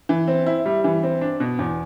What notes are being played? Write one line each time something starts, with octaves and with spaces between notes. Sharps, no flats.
E3
C4
E4
G3
E3
C4
D4
B2
E2